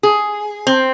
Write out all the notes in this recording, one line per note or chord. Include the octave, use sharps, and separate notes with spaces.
G#4
C4